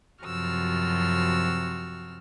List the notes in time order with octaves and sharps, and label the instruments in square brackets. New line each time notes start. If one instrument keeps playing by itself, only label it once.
[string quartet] F#2 C3 F3 F#4 E6 F6